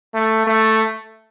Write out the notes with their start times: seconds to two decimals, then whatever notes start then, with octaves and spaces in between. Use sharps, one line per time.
0.14 A3
0.47 A3